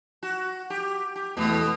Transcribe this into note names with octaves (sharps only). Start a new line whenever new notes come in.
F#4
G4
G4
E2 B2 A3 B3